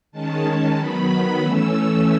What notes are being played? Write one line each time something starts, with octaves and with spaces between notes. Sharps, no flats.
D#3 G#3 C#4 A5
D#3 F#3 B3 B5
E3 A3 C#4 E6